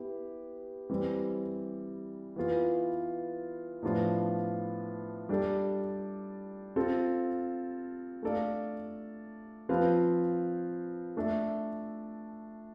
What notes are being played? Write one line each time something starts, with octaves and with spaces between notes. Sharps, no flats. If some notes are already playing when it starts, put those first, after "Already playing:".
Already playing: B3 E4 G4
E3 G3 C4
E3 B3 F4
A2 F3 B3 D4 F4
G3 D4 A4
C4 F4 A4
A3 D4 A4 D5 F5
F3 C4 F4 B4 F5
A3 D4 A4 E5